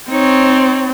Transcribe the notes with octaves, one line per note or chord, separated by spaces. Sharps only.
C4 D#4 C#5